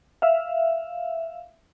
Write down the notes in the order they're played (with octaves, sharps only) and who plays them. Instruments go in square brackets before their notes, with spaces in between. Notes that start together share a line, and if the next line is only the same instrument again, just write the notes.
[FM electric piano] E5 F5